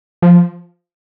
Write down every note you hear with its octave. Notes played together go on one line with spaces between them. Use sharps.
F3